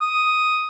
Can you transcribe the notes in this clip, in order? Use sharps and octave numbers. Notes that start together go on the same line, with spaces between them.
D#6